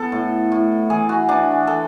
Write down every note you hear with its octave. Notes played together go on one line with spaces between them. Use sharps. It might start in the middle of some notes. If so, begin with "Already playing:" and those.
Already playing: B3 A4
A2
A2
E3 G#4
F#4
E3 D4
A4